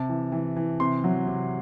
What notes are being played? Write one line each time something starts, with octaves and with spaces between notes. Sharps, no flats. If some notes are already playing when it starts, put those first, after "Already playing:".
Already playing: C3 A5
E3
E3
E3
C3 C6
F#3
C3